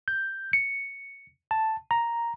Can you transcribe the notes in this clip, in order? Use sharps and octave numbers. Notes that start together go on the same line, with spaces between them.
G6
C#7
A5
A#5